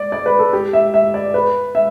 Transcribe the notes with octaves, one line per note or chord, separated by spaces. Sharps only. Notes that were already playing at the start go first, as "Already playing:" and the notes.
Already playing: D5
D5
B4
A4
G4
E5
E5
D5
B4
E5